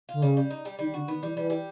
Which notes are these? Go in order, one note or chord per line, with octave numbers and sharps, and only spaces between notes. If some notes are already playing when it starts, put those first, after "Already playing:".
D3 F4
C#3 G3
G3
D#4
G3
D#3 G3
D3 F#4
D#3 B3
E3 G3
E3 G3
G3